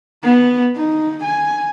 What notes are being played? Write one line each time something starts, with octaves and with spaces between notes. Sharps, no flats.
B3
D#4
G#5